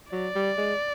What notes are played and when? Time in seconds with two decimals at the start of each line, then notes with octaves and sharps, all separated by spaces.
0.12 F#3 D5
0.35 G3
0.58 G#3